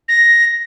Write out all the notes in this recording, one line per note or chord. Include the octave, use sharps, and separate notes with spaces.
A#6